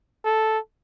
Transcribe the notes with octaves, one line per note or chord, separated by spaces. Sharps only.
A4